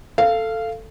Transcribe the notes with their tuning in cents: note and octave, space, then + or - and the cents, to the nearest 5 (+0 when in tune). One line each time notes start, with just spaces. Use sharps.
A4 +10 F5 -15